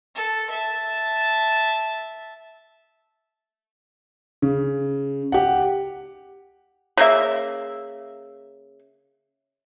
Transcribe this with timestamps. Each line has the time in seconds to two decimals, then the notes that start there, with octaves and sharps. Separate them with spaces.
0.15 A4
0.50 E5 A5
4.42 C#3
5.32 G4 F#5
6.97 C#3 A#3 E5